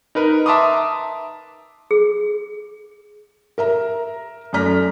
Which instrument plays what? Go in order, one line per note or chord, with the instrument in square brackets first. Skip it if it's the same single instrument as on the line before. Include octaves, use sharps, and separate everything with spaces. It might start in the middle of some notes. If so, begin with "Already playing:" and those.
[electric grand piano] D#4 A#4 B4
E5 A5 A#5 C6 D6 D#6
[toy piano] G#4
[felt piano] A#4 E5 A#5
F#2 A3 D5 A#5 F6 B6